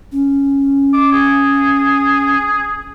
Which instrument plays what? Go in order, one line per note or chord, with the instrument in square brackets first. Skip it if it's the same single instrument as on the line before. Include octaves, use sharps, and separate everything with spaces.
[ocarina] C#4
[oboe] D6
G#4